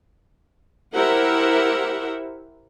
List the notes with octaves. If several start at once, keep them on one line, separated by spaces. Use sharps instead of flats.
E4 G4 A#4 C5 E5 F#5